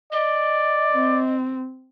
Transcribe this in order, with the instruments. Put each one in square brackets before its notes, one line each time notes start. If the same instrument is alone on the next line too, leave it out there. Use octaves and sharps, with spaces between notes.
[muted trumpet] D5 [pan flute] D#5
[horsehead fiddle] C4